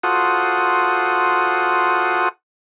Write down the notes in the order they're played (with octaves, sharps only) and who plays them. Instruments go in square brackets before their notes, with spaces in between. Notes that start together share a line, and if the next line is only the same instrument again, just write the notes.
[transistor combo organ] F4 F#4 A4 C5 F#5 D#6